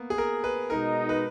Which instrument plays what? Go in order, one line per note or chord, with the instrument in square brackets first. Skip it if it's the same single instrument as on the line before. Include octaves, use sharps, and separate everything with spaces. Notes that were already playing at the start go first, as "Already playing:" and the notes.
Already playing: [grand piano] A#3 B3
G#4
A#4
B4
[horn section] B2 G#3 D#4 [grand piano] A#4
[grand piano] B4